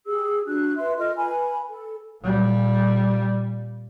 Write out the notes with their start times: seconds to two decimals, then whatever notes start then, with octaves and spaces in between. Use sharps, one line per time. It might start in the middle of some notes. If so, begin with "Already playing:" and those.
0.06 G4 G#4 E6
0.45 D4 F#4 F#6
0.76 B4 E5 C6
0.98 F4 A4 D#5 F6
1.17 B4 G#5 B5
1.68 A4
2.23 A#2 G3